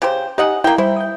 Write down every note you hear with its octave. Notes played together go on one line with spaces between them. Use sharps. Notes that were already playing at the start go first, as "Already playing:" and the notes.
C#3 G4 C5
D#4 G4 D#5 F#5 G#5
A#3 E4 G5
G3 E4 C5
D#6 G6